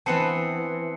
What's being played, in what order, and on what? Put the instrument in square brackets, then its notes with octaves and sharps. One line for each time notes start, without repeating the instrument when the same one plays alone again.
[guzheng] E3 B3 C4 [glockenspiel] A5 C7 C#7